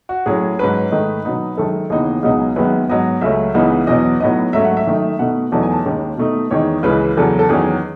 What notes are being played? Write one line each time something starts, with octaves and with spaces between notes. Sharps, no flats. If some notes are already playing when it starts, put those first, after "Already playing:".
F#4
A2 F#3 C#4 G#4
G#2 F#3 C#4 B4
G#2 D#3 A3 D#4
B2 F#3 B3 D#4
F#2 D#3 G#3 A4
D#2 C#3 E3 B3 D#4 G#4
C#2 B2 F#3 B3 D#4 G#4
F#2 D#3 G#3 B3 B4
G#2 F#3 B3 D#5
C#2 C#3 F#3 A3 E5
C#2 C#3 E3 B3 D#4
E2 B2 F#3 D#5
A2 F#3 B3 D#4 D#5
G#2 F#3 A3 C#4 E5
F#5
E5
F#2 D#3 A3 D#4
B2 A3 D#4 F#5
E2 B2 F#3 A3 D#4 A5
G#5
A5
D#2 D#3 G#3 C#4
B2 A3 D#4
E2 D#3 G#3 D#4 C#5
C#2 C#3 E3 G#3 B4
E2 C#3 F#3 A4
A4
E2 D#3 F#3 C#4 G#4